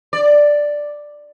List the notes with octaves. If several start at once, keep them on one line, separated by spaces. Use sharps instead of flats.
D5